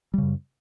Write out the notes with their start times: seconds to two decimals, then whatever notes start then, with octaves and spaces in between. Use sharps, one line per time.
0.14 G3
0.18 C#3
0.23 F#2